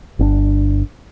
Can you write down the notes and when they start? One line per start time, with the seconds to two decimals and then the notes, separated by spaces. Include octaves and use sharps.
0.19 G1 C4 D4